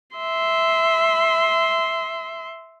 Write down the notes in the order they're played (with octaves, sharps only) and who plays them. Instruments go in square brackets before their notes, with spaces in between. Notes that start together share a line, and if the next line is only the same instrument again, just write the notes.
[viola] E5 C6